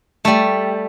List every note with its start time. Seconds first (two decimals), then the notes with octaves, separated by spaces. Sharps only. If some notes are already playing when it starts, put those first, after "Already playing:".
0.25 G3 A3